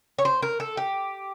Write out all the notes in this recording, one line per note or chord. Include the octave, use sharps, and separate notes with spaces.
C#5
C5
A#4
A4
G4